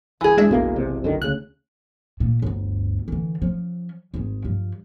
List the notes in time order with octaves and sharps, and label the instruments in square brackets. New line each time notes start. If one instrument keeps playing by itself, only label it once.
[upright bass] B1 G2 [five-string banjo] E3 G#4
[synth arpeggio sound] G#3 D4 E5
[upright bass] F#1 B1 [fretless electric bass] B2 A#3
[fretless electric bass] C3
F#2 D3 D#3
[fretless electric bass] D2 C#3 [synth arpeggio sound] F#6
[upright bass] A#2
G1 D2
D3 E3
F3 C#4
G#1 G#3
G2 F3